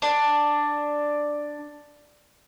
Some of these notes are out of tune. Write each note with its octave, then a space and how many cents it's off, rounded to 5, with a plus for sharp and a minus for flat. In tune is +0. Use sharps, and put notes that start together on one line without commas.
D4 +5